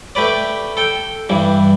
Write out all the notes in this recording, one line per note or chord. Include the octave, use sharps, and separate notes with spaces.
A3 G4 B4 D5
A4 G5
G2 E3 G3